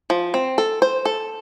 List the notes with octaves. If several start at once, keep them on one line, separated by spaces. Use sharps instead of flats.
F3
C4
A4
C5
A4